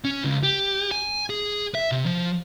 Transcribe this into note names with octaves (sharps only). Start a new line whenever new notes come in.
C#4
C#2
G4
G#5
G#4
E5
C3
F3